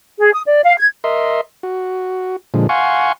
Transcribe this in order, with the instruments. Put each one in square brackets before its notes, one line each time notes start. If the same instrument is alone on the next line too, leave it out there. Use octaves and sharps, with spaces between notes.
[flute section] G#4
D#6
D5
F5
G#6
[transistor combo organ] A#4 D#5 E5 C6
F#4
A#2 D3 F3 G#3
F5 F#5 G#5 C6 C#6